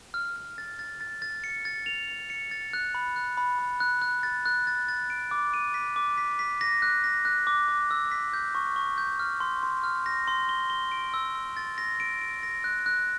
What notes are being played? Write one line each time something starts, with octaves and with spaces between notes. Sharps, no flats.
F6
F6
A6
A6
A6
A6
C#7
A6
F7
F7
C#7
A6
F#6
B5
F#6
B5
B5
F#6
F#6
A6
F#6
A6
A6
D7
D6
D#7
B6
D6
B6
B6
A#6
F#6
A#6
F#6
D6
D6
E6
B6
G6
C#6
C#6
G6
F6
C6
C6
F6
A#6
C6
G7
G7
D7
E6
E6
A6
A#6
D7
D7
A#6
F#6
F#6